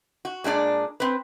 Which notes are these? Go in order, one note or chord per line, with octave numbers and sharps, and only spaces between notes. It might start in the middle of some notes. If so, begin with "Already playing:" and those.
F#4
A#2 G#3 D4 D5
C4 B4